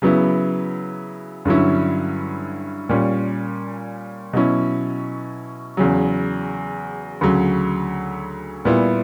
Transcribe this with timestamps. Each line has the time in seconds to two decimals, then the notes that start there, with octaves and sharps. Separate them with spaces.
0.02 C#3 F#3 B3 E4
1.45 G2 D3 F#3 C#4 E4
2.89 A#2 G3 C#4
4.33 B2 F#3 C#4 E4
5.77 E2 C#3 F#3
7.21 D2 C#3 F#3
8.65 A#2 G3 B3 E4